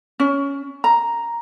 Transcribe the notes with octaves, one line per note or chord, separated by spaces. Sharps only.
C#4
A#5